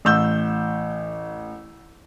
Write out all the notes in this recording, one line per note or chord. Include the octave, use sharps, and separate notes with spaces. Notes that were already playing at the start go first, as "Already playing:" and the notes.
A1 E6 G6